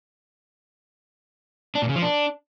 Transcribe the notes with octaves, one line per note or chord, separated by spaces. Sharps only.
D4
A#2
C#3
F3
D4